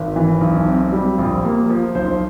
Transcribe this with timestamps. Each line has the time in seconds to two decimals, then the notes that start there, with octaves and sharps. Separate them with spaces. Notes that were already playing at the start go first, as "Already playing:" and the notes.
Already playing: G#1
0.16 E3
0.41 B1
0.67 C4
0.93 G3
1.18 A#1
1.45 A#3
1.70 F3
1.95 B1 C5